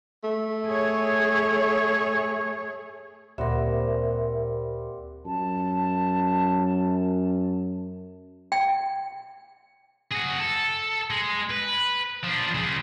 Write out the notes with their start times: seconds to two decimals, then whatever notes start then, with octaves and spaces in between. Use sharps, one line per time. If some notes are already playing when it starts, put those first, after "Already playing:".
0.24 A3
0.69 G#4 C#5
3.38 D2 A#2 G3 C4 A#4 E5 F#5
5.26 F#2 A5
8.52 G5
10.12 F#4 G#4
10.40 A4
11.10 G#3
11.51 B4
12.23 F3 D4
12.55 C#3 G#3